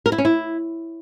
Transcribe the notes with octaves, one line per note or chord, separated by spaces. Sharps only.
A#4
E4
C#4
E4